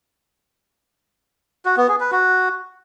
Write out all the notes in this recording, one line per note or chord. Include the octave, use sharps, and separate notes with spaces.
F#4
B3
G#4
B4
F#4